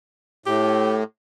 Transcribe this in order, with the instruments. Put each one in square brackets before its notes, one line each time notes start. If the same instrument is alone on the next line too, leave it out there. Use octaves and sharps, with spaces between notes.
[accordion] A2 [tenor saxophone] G4